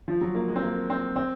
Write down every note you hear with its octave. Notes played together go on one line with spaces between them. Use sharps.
F3
F#3
A#3
G#3
C4
A#3
C4
C4